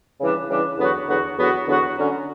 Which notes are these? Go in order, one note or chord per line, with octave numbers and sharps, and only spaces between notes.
C#3 E3 G3 D4
C#3 E3 G3 D4
E2 D3 F#3 B3 F#4
E2 D3 F#3 B3 F#4
E2 D3 F#3 B3 F#4
E2 D3 F#3 B3 F#4
D3 F#3 C#4